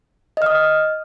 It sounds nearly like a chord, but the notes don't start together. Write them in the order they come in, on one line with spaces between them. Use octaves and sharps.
D#5 F6 D#6